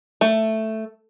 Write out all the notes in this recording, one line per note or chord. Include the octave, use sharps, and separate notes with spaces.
A3